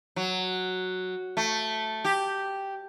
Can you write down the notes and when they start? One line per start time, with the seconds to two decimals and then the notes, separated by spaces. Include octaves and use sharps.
0.16 F#3
1.37 A3
2.05 G4